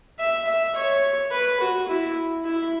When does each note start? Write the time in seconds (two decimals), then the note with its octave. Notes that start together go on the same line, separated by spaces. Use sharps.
0.19 E5
0.47 E5
0.75 C#5
1.31 B4
1.60 F#4
1.88 E4
2.45 E4